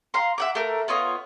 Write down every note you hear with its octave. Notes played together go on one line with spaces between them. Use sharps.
F5 A#5 C6
E5 F#5 D6
A3 A#4
B3 F4 C#5 D#5